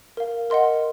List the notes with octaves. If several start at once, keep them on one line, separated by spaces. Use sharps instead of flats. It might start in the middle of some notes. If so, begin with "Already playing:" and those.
A#4 F5
A#4 D#5 F#5 C6